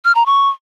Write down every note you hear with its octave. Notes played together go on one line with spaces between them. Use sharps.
F6
A#5
C#6